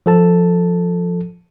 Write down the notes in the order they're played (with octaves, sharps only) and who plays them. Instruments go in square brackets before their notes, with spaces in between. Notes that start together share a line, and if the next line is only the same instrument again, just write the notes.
[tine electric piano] F3 A4 A5